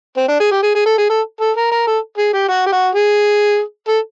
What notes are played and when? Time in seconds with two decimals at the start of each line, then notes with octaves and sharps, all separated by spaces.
0.17 C4
0.28 D4
0.40 G#4
0.51 G4
0.63 G#4
0.75 G#4
0.86 A4
0.98 G#4
1.09 A4
1.40 A4
1.56 A#4
1.71 A#4
1.87 A4
2.18 G#4
2.33 G4
2.48 F#4
2.66 G4
2.72 F#4
2.95 G#4
3.88 A4